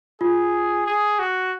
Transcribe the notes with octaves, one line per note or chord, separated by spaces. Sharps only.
F4 G#4
G#4
F#4